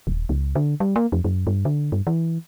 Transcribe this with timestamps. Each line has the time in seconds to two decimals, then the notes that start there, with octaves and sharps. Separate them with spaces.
0.07 D#1
0.29 C#2
0.55 D3
0.80 G3
0.96 A#3
1.12 F2
1.24 F#2
1.47 G2
1.65 D3
1.92 G2
2.07 E3